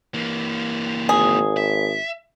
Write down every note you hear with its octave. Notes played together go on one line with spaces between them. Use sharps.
E3 A#3
G#1 G#4
E5